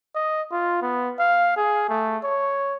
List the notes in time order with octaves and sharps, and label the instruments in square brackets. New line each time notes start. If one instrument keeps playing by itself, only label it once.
[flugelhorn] D#5
F4
B3
F5
G#4
A3
C#5